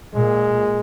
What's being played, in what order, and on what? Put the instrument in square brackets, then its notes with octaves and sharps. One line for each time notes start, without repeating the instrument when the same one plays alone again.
[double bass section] A#2 [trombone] G#3